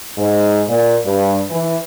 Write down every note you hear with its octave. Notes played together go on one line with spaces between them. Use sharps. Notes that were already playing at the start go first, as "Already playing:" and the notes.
G#2
A#2
G2
E3